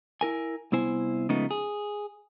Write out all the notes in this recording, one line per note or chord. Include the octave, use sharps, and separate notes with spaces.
E4 A#4 G#5
C2 B3 E4 C5 G#5
C#3 F3 G#3 A3 B3 D#4
G#4